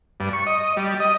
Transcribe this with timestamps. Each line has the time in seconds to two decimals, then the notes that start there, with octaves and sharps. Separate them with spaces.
0.20 G2
0.33 C#6
0.46 D#5
0.77 G3
1.00 D#5